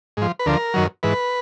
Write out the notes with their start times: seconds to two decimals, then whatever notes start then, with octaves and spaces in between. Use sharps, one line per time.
0.17 G#2 F3
0.39 B4
0.46 D2 D3 F3 A#4
0.74 F#2 D#3 F#3
1.03 G#2 E3 B4